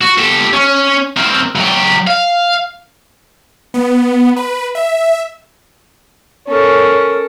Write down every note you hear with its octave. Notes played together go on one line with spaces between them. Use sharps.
F#4
G4 A4
C#4
C4 A#4
F#3 G4
F5
B3
B4
E5
C#4 A4 A#4